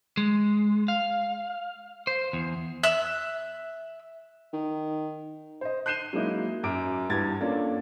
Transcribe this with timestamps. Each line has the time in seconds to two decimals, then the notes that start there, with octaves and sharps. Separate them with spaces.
0.17 G#3
0.88 F5
2.07 C5
2.33 E2
2.83 E5 F#6
4.53 D#3
5.61 C5 D#5
5.86 F#6 G6 C7 D#7 E7 G7
6.13 F#3 G#3 A#3 D#4 E4
6.63 F#2 D6 D7
7.10 E2 G2 G#6 A6
7.41 A#3 C#4 D4 F4 A4